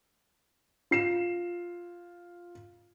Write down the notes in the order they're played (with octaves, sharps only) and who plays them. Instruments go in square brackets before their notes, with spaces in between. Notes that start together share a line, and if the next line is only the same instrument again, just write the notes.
[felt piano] F4 C7 E7